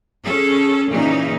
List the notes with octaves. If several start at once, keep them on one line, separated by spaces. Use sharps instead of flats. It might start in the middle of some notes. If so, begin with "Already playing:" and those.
C#4 G#4 A4
A#2 C#3 E3 D#4